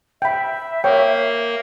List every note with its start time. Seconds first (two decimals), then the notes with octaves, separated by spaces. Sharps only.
0.22 E5 G5 B5
0.84 A#3 A#4 C#5 G5